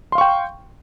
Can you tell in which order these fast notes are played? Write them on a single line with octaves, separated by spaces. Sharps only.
C6 F5 C#6 G5